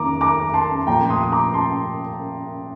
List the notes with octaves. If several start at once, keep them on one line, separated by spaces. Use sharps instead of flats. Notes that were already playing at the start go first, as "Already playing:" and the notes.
Already playing: F2 D#3 A#3 A#5 D6
A#5 D6
A5 C6
A#2 F3 A3 G5 A#5
C6 D#6
D#6
A#5 D6
A5 C6